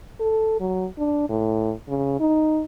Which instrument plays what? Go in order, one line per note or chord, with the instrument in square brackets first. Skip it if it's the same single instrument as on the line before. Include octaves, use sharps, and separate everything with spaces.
[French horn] A4
F#3
D4
A2
C#3
D#4